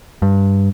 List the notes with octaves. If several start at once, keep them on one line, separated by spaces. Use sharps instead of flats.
G2